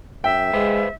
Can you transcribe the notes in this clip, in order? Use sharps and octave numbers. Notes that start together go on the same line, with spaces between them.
F#2 E5 G5
G#3 B4 C5 F5